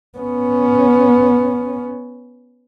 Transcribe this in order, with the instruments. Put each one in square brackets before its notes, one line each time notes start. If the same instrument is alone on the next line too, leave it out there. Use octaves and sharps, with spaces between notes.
[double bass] B3 C#4